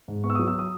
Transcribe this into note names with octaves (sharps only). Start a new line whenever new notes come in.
G#2
B3 C#6
E6
D#6
F#3
E6
D#6